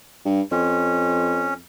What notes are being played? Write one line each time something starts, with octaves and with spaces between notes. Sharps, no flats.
G2
F2 C#4